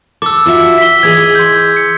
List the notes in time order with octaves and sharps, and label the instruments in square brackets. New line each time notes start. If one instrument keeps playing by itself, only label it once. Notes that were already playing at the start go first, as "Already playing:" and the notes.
[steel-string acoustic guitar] A4 [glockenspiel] D6 E6
[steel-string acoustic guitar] F4 F#4 E5
[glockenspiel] B6 G7
[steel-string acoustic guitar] E3 G#4 D#5 [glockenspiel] G#6
[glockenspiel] C6 G6
C#7